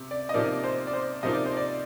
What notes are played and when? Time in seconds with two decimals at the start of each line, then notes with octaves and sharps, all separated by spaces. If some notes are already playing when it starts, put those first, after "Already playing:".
Already playing: C3
0.11 D5
0.29 D#5
0.34 C3 F3 A#3 D#4 D5
0.64 C5
0.87 D5
0.93 C5
1.23 C3 F3 A#3 D#4 D#5
1.34 D5
1.46 C5
1.57 D5